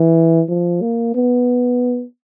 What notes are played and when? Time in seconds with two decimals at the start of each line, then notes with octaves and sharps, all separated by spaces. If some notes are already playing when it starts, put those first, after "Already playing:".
Already playing: E3
0.49 F3
0.81 A#3
1.15 B3